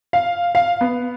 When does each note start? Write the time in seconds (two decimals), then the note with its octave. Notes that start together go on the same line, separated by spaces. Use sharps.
0.13 F5
0.55 F5
0.81 B3